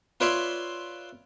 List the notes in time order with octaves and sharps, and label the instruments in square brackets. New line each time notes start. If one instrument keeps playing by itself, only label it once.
[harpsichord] F4 B4 C#5 D5 E5 C6